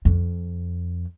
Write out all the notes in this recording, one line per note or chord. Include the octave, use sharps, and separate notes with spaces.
F2